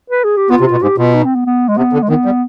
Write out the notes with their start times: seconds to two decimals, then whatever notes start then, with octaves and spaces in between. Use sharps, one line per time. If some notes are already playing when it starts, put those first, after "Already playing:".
0.10 B4
0.24 G#4
0.37 G4
0.50 B3 F4
0.60 C3
0.66 F4
0.71 B2
0.82 G#2 G4
0.97 B2 F4
1.14 D#4
1.24 C4
1.35 B3
1.46 B3
1.68 G#3
1.77 C3 B3
1.93 D3
2.02 G#3
2.09 D#3 B3
2.25 G3